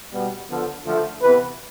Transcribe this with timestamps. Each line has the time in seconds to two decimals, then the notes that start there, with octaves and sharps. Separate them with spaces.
0.12 B2 G3 B3
0.49 D3 F3 B3 A4
0.85 D3 F3 A3
1.22 C3 E3 B3 B4